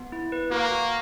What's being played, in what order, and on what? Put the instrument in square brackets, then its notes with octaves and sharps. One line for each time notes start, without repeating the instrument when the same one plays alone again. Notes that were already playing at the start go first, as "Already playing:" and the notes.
Already playing: [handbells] B3
E4
B4
[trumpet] A#3 [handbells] F#4
[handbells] F#4